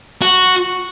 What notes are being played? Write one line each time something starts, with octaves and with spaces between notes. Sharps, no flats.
F#4